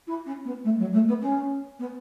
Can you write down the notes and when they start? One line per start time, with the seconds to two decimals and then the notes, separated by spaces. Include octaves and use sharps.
0.07 E4
0.26 C#4
0.45 B3
0.64 A3
0.78 F#3
0.93 A3
1.07 B3
1.21 C#4
1.79 B3